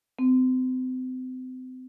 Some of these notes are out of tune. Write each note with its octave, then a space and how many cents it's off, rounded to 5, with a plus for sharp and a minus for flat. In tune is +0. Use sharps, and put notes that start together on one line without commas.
C4 -35